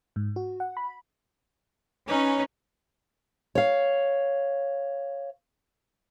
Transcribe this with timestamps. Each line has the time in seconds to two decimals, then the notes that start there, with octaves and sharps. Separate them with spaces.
0.16 G#2
0.36 F#4
0.60 F#5
0.77 B5
2.08 C#4 D#4 B4
3.55 C#5 F5